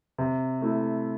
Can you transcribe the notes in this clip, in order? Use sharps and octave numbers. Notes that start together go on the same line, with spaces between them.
C3
A3 E4 A4